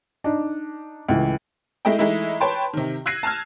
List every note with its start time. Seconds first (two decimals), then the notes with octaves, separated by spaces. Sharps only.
0.24 D4 D#4
1.08 C#2 A2 E3
1.85 G#3 A3 E4 D#5 G5
1.99 E3 G#3 A3 D#4 E4
2.40 B4 C#5 G5 A5 C6
2.73 C3 D#3
3.06 E6 F#6 G#6 A#6 C7 D#7
3.23 A5 F6 G#6